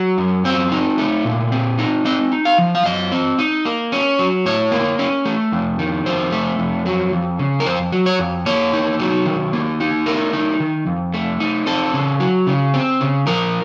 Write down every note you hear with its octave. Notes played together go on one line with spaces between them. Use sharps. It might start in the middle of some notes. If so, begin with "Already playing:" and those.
Already playing: F#3
F#2
C4 C5
D#4
A3
A#2
C4
D#4
C4 D#5
D#4
F5
F3
F5
F#2 D#5
C4
D#4
A#3
C#4
F#3
A2 C#5
A#3
C#4
A3
F2
D#3
F2 C5
A3
F2
F#3
F2
C#3
A#4
F2 C5
F#3
C#5
F2
A#3 C#5
D#4
F#3
D#3
A#3
D#4
A3 A#4
D#4
D#3
F2
A3
D#4
C4 A4
C#3
F#3
C#3
C4
C#3
F3 A#4